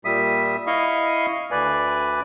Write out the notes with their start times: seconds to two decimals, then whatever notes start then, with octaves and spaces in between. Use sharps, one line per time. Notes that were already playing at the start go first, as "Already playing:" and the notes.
0.05 A#2 G3 E5 D#6
0.67 E4 D#5 F5 C#6 D#6
1.51 D2 B4 D5 G#5